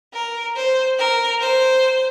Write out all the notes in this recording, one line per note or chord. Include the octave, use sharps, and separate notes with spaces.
A#4
C5
A#4
C5